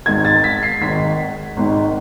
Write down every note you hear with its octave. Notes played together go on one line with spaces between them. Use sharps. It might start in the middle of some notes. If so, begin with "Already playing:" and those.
G#1 G#2 D#3 G#6
A6
B6
C7
G#1 G#2 D#3 B6
G#1 G#2 D#3